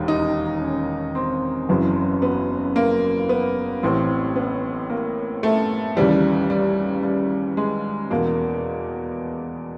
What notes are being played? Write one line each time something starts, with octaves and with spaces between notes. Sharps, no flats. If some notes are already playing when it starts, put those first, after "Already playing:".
Already playing: E1 D#2 D#3
D#4
C#4
C4
F#1 F#2 C#3 E3
B3
A#3
B3
A1 A2 E3 C4
B3
A#3
A3
D#2 C#3 E3 G3
G3
G3
G#3
E2 B2 A#3